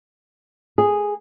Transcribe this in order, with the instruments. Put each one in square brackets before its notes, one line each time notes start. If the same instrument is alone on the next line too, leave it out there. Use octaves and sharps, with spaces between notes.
[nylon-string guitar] G#4